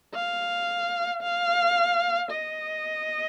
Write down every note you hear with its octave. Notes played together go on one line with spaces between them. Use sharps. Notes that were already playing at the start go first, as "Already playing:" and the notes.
F5
F5
D#5